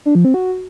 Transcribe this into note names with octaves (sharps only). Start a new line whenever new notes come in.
D4
F3
C4
F#4